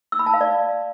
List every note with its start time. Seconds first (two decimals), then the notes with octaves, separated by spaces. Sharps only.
0.12 E6
0.19 B5
0.26 A5
0.34 F5
0.41 D5